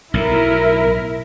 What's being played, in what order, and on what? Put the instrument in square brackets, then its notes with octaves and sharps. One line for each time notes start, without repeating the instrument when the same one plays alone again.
[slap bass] B1 A2 [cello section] E4 A#4